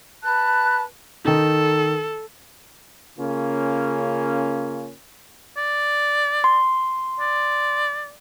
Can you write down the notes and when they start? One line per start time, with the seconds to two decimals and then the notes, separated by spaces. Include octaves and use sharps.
0.23 B4 A5 F#6
1.25 D#3 D#4 A4
3.19 C#3 A#3 C#4 F4
5.57 D5
6.44 C6
7.20 D5